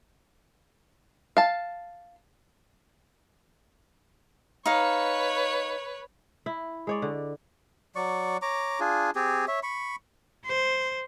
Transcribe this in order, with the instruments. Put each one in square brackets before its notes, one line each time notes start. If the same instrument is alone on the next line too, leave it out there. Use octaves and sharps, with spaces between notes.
[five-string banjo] F5 A5
[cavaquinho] D#4 F5 [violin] B4 C#5
[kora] E4
G#3 C#5 D5
D3
[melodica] F#3 D5 C#6
C#5 A#5 D6
D4 F4 G#4
C4 G4 G#4
C#5 E5
B5 C#6
[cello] C5